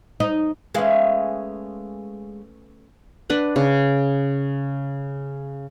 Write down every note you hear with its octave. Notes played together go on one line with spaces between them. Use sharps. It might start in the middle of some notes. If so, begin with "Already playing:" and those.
D#4
G#3 A3 B3 C#4 G#4 F5
D4 B4 F#5
C#3